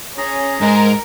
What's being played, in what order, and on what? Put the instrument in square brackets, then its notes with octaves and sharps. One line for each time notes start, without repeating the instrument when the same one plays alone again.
[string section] C#4 [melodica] G#4 A#5
[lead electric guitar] G#2 [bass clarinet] G#3 [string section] A#4